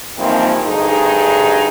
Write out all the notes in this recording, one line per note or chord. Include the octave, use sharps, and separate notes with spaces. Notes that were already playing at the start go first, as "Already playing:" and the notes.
G2 E3 F3 A#3 C4 D#4
D2 G2 D#4 G#4